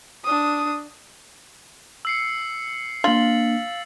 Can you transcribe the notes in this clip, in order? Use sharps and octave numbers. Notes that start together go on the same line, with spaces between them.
D4 D#6
E6 C7 C#7
A#3 D4 F4 F5 A6 F#7